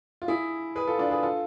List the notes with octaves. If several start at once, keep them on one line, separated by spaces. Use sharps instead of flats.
F4
E4 G#4
G#4 B4
F4 A4
D4 F4
G#4 B4
F4 A4